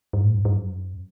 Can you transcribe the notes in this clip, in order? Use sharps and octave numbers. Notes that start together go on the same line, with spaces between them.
G2
A2
G2
G2
F#2